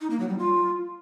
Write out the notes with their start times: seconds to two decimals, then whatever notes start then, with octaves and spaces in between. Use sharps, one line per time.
0.01 D#4
0.10 A#3
0.20 F#3
0.29 G3
0.39 F4